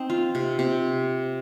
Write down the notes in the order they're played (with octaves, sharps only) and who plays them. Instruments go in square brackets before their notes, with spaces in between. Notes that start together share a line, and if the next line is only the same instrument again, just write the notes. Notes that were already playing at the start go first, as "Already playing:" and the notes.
Already playing: [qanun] C4 D#4
F4
C3
C3